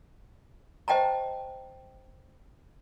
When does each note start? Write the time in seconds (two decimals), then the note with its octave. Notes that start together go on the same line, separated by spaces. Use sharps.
0.88 C5 D#5 G5 A5 A#5